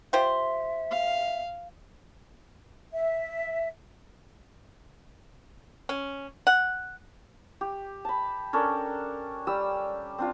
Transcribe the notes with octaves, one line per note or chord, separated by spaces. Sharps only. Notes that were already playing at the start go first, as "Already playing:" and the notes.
F4 G4 C5 E5
F5
E5
C#4
F#5
G4
A5 B5
C#4 D4 A4 A#4
G3 G4 E6
C4 D4 F4